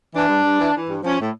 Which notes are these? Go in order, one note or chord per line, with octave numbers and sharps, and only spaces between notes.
E3 D4
G2
G2
E3
E3
G2
F3 C#4
A2